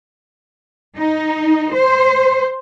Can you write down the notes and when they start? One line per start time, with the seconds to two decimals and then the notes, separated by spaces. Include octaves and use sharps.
0.96 D#4
1.73 C5